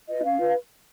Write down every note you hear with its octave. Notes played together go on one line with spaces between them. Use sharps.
F4 B4 D#5
C#4 F5
F4 B4